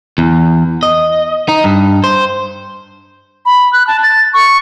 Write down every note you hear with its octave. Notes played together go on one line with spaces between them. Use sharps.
E2
D#5
D#4
G2
C5
B5
F#6
A5
A6
C#6